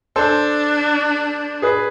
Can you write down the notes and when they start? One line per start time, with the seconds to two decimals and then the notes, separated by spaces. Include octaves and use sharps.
0.16 D4 A4 C5
1.62 G#4 B4